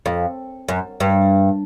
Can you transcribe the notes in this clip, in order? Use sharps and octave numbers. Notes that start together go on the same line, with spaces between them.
F2
F#2
G2